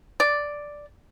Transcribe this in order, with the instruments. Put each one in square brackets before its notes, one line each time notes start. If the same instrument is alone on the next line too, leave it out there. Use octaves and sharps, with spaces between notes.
[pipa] D5